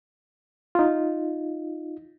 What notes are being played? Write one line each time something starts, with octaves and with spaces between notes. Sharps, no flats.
D#4 F4